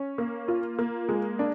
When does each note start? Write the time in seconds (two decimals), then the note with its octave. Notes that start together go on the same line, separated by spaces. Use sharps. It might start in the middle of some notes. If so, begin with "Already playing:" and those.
Already playing: C#4
0.18 A#3
0.48 F4
0.79 A#3
1.09 G#3
1.39 D4